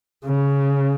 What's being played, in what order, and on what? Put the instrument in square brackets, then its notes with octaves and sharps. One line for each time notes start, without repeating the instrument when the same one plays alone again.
[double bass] C#3